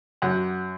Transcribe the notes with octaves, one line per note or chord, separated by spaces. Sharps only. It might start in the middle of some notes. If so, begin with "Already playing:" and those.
F#2 F#5